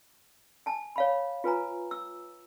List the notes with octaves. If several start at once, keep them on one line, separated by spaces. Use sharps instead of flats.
G#5 A5
C#5 F5 B5
F4 B4 G#5 A#5
E6